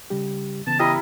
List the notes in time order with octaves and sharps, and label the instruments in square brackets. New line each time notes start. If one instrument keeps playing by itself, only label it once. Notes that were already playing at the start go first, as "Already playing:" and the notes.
[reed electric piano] C#3 G3 G4
[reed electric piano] C#3 E3 B3 [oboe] A5
[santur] G3 E4 A#4 [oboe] D#5